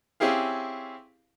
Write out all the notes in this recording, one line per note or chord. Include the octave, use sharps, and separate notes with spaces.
C4 C#4 E4 G4 G#4 F5